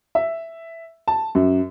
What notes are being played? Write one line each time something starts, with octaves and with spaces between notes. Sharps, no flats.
E5
A5
F#2